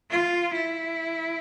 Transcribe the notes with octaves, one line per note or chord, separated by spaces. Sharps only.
F4
E4